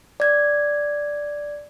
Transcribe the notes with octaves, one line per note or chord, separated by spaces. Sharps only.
D5 G#6